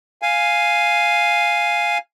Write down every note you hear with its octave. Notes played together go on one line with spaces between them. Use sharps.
F5 G#5